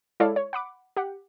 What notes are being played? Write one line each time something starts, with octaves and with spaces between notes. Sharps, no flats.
G#3 E4 A4 C#5 D5 F5
C#5
F#5 B5 D6
G4 F#5